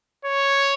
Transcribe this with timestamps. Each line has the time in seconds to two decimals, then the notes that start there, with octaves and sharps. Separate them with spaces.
0.25 C#5